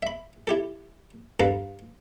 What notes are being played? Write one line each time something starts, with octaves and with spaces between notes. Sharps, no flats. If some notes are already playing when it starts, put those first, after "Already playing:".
E5 B5
E4 G4 A4
G2 A4 B4 F5 A#5